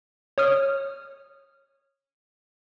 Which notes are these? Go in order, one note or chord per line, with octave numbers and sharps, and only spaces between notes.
C#5 D#6 F6